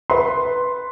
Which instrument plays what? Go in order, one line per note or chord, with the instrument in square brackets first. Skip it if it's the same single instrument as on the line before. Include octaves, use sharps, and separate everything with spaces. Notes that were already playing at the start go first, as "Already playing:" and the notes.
[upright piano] B4 C6